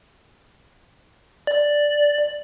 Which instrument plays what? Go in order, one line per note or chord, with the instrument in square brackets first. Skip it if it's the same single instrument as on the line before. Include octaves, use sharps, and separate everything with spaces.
[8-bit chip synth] D5